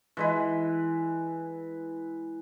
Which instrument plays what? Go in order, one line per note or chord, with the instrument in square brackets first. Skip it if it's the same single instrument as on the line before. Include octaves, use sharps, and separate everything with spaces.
[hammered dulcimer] E3 G#3 B4